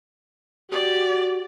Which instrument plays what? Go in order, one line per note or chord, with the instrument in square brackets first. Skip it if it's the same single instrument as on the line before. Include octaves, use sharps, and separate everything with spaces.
[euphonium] F#4 [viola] G4 D5